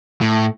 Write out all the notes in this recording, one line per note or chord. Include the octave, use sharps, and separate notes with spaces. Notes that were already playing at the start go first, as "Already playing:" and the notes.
A2